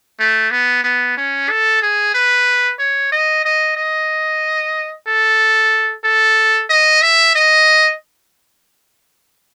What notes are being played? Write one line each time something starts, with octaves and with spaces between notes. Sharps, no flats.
A3
B3
B3
C#4
A4
G#4
B4
C#5
D#5
D#5
D#5
A4
A4
D#5
E5
D#5